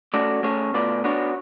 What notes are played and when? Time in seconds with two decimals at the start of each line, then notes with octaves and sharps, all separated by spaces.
0.14 A3 C#4 F#4 A4 D5
0.43 A3 C#4 G#4 C#5
0.74 B2 A3 F4 B4 D5
1.04 B3 D4 F#4 C#5